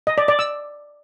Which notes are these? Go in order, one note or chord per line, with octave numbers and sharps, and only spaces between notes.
D#5
D5
D5
E6